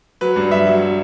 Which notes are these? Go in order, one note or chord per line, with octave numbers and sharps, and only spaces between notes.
F#3 B4
G2
F#3 E5
F#3